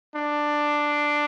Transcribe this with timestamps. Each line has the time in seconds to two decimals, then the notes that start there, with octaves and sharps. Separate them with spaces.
0.16 D4